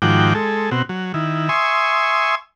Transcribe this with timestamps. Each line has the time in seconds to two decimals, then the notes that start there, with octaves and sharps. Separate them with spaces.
0.02 G#2 D#3 F3 F#4 G5 D6
0.35 G#3 A4
0.71 B2 C4 F#4
0.89 F#3
1.14 D#3 E4
1.49 E5 G#5 C6 C#6 D#6